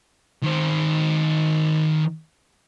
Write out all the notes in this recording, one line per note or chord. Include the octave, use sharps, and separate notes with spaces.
D#3 C5